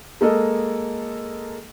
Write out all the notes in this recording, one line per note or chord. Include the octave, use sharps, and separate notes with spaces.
G#3 A#3 A4 D#5